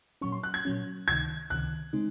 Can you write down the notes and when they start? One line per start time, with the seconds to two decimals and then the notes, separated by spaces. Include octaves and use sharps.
0.21 A#2 F#3 C#4 C#6
0.32 C6
0.43 F#6
0.54 G#6
0.65 A#2 F#3 C#4
1.08 C#2 C3 D#3 G#6
1.50 C#2 C3 D#3 F#6
1.93 C#3 G#3 C4 D#4